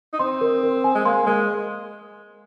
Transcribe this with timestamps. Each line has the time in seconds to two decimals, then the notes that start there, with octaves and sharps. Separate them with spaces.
0.13 D#4
0.19 C4 C6
0.41 A#4
0.63 A#4
0.84 G#5
0.95 G#3
1.05 A#3 C6
1.26 G#3 A#4